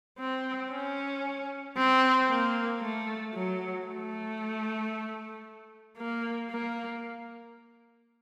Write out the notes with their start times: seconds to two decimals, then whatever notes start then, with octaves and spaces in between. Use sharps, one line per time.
0.19 C4
0.71 C#4
1.77 C4
2.29 A#3
2.82 A3
3.35 F#3
3.87 A3
5.97 A#3
6.50 A#3